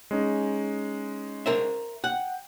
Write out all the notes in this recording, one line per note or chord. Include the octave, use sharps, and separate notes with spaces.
G#3 C#4 D#4
A#4 C5 E5
F#5 G5